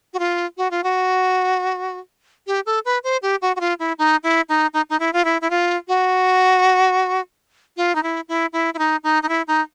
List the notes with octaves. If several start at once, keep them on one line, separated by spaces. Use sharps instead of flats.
F#4
F4
F#4
F4
F#4
G4
A4
B4
C5
G4
F#4
F#4
F4
E4
D#4
E4
D#4
D#4
D#4
E4
F4
E4
E4
F4
F#4
F4
D#4
E4
E4
E4
E4
D#4
D#4
D#4
E4
D#4